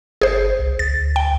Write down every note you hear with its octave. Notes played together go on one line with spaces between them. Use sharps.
G1 G#4 C5
C2
D2 A6
G5